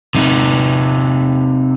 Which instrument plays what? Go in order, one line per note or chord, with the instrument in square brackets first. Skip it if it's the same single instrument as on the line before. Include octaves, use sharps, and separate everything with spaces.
[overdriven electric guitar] C3 D#4